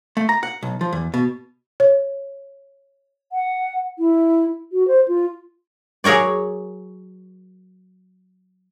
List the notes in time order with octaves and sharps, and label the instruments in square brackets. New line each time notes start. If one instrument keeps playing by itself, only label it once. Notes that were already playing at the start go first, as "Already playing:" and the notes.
[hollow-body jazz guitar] A3
A#5
F#5
B1
F3
E2
B2
[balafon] C#5
[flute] F#5
E4
F#4
C5
F4
[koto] F#3 G#4 A#4 C#5 D5